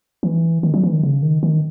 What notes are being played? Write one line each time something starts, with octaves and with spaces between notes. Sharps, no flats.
E3
D#3
F#3
E3
D#3
C#3
D#3
D#3